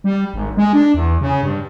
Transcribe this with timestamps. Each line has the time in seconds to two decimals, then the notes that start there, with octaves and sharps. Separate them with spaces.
0.04 G3
0.34 G#1
0.57 G#3
0.73 D4
0.94 E2
1.21 C#3
1.43 G2